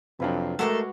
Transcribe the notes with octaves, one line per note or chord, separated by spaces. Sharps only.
F2 C3 F#3 D4 B4 F5 G5
G#3 A3 F#4 A4 A#4 F5 F#5 D6